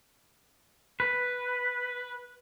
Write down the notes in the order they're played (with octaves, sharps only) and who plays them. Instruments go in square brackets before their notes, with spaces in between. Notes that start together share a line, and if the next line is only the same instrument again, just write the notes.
[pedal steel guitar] B4